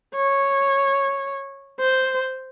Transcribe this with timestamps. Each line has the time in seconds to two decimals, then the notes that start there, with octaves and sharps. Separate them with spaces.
0.15 C#5
1.79 C5